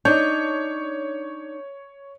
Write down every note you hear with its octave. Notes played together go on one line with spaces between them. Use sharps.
D4 D#4 C#5 G6